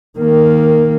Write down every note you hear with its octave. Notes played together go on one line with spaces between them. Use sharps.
D#3 A#3